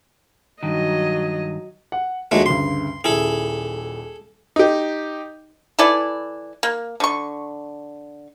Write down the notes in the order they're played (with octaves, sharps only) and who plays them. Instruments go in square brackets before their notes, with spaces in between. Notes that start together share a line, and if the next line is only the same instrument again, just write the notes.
[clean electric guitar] G2 D#3 [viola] F#3 D#5
[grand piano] F#5
[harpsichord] D#2 G#3 A3 [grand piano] F3 D4 F#4
[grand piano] D2 G2 C#3 [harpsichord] C6
[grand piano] D#1 E4 [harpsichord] G#4 A4
[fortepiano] D#4 G4
[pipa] E3 E4 A4 D5
A#3
D3 C#6